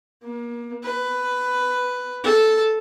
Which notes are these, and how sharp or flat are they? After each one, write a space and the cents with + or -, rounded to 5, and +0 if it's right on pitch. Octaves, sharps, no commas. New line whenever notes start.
A#3 +30
B4 +10
A4 -5